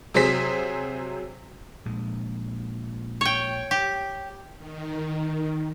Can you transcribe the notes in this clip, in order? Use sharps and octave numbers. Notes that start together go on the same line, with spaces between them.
C3 F#3 G#4 C5 B6
A#1 A#2 G#3
C#5 G5
G4
D#3